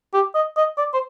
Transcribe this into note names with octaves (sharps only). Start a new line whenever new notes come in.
G4
D#5
D#5
D5
C5